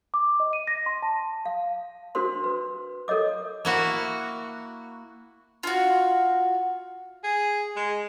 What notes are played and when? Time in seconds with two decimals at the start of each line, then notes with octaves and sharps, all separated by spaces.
0.14 D6
0.40 D#5
0.53 D#7
0.67 A#6
0.86 C6
1.02 A5
1.45 F5
2.15 D4 F#4 A#4 C5 C6
2.44 B4
3.08 A4 A#4 C#5 D#5 D6
3.65 A#3 E4 F#4
5.63 F4 F#4
7.24 G#4
7.77 G#3